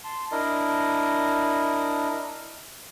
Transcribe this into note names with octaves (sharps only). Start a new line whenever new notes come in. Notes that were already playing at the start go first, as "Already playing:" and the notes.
A5 C6
D4 E4 A#4 D#5